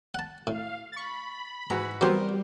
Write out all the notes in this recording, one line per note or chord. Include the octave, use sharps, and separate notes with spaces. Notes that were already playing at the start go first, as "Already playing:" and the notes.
F#5 A5
A2 F5
B5 C#6 A6
G#2 E3 F#4 A#5
E3 F#3 G3 B3 C4 G4 A#4 C5